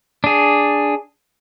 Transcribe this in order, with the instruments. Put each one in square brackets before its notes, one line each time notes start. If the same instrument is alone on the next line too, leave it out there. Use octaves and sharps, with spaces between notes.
[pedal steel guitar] D4 G#4